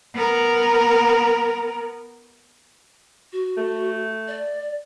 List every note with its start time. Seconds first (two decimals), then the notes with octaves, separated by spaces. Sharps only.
0.14 B3 A#4
3.33 F#4
3.57 A3
4.28 D5